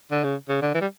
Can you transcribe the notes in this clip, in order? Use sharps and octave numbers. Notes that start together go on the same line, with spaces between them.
D3
C#3
C#3
D3
E3
G3